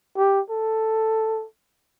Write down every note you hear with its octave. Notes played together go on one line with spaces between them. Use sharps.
G4
A4